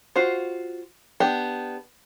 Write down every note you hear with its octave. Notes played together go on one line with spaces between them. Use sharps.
F4 F#4 C5
B3 D4 G4